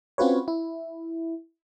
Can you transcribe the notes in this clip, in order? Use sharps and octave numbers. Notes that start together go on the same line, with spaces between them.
C4 C#4 F4 F#4 B4 C#5
E4